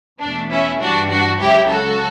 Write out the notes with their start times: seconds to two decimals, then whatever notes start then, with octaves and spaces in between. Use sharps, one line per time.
0.20 E2 B2 A3 D4
0.50 C#4 E4
0.80 G2 E3 G3 D4 F#4
1.10 D4 F#4
1.39 C#2 C#3 F#3 E4 G4
1.69 F#4 A4